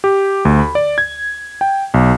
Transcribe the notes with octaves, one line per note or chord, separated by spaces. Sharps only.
G4
D2
B5
D5
G#6
G5
B1